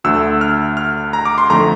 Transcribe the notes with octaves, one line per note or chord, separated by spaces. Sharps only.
D2 D3 A3 E6
F6
F6
A#5
D6
C6
F2 D3 A3 A#5